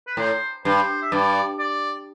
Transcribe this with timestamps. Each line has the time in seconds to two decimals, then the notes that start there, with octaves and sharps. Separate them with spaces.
0.07 B4
0.17 A2 C5
0.65 G2 C5
1.02 E5
1.12 G2 D5
1.59 D5